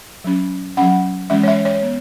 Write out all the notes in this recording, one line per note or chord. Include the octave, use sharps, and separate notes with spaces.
F#3 C#4
F#3 C#4 F#5
E3 G#3 C#4 E5
C#5
E5
C#5
B3